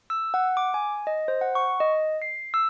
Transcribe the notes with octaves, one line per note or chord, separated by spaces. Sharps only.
E6
F#5
D6
G#5
D#5
C5
F#5
C#6
D#5
C7
E6